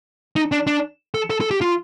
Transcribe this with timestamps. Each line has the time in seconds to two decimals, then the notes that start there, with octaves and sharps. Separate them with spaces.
0.36 D#4
0.52 D4
0.67 D4
1.14 A4
1.30 A4
1.41 A4
1.51 G4
1.61 F4